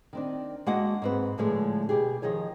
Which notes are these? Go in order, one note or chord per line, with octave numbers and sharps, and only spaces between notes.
D#3 C4 D4
G#3 A#3 D4 F#4 D#5 F#5
G#2 C4 B4
A2 D3 F3 G#3 A3
B2 G4 G#4
D#3 F3 D#4 G#4 C#5